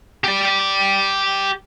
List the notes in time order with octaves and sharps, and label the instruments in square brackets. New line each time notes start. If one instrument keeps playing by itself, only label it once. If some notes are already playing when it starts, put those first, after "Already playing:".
[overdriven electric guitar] G4 D5